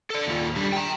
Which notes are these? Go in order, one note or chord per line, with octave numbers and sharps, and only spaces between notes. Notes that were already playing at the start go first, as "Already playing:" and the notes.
A4 D5
D#2 F4
D3 G3
G5 A#5